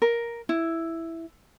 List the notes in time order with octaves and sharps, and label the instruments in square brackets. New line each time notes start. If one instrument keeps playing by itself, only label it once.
[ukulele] A#4
E4